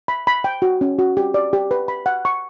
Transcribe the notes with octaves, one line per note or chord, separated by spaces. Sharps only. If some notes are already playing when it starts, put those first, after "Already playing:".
B5
B5
G5
F#4
C#4
F#4
G4
D5
G4
B4
B5
F#5
C#6